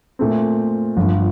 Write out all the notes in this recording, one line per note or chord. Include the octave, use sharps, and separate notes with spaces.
A#2 A3 C4
G1 G2 F3